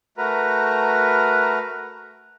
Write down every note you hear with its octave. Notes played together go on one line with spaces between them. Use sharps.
A3 F#4 A#4 B4 A#5